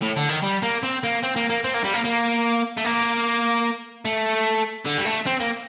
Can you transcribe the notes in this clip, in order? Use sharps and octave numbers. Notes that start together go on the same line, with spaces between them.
A2
D3
D#3
G3
A#3
C4
A#3
C4
A#3
A#3
C4
A#3
G3
A#3
A#3
A3
A#3
A3
D3
G3
A3
C4
A#3